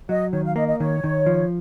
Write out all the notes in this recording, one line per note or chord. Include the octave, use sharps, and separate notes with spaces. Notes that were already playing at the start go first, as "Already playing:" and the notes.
F#3 D#5
D#3 C#5
F5
A#3 D#5
D#5
D#3 C#5
D#3
F3